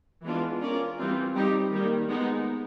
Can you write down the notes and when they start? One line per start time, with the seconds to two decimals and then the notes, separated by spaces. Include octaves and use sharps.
0.24 E3 G#3 B3 D4 F4
0.61 C#4 F4 A#4 D5
0.98 E3 G3 C4 F4
1.35 G3 C4 D#4 G4
1.72 D#3 G3 A#3
2.09 G#3 B3 D#4